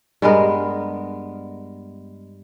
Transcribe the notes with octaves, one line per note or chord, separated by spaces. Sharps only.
G2 G#3 B3 A#4